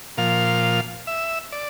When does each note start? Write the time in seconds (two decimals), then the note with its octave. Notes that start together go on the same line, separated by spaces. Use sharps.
0.17 A#2 F3 F5
1.07 E5
1.52 D5